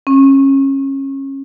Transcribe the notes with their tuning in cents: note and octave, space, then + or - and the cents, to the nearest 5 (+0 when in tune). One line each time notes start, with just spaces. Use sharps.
C#4 -25